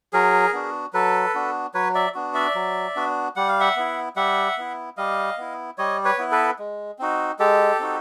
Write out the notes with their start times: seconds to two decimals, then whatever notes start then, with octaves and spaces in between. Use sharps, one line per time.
0.13 F#3 G#4 A#4
0.53 B3 D4 F#4
0.93 F#3 A4 B4
1.35 B3 D4 F#4
1.74 F#3 B4 C#5
1.95 D5 E5
2.14 B3 D4 F#4
2.35 D5 E5
2.55 F#3
2.96 B3 D4 F#4
3.36 G3 F#5
3.48 F5
3.60 E5 F#5
3.76 B3 E4
4.16 G3 E5 F#5
4.57 B3 E4
4.97 G3 D#5 F5
5.38 B3 E4
5.78 G3 C#5 D#5
6.05 B4 C#5
6.18 B3 E4
6.31 A4 B4
6.59 G#3
6.99 C4 D#4 F#4
7.39 G#3 G4 A4
7.80 C4 D#4 F#4